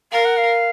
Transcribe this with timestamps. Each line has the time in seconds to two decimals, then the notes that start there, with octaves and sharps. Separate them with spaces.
0.12 A#4 F5
0.25 F#5
0.37 F5